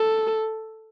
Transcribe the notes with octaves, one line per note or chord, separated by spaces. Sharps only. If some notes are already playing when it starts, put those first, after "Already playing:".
Already playing: A4